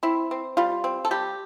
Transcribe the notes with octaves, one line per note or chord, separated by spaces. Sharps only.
C4 E4
C4
G3 F4
C4
A4
G3 G4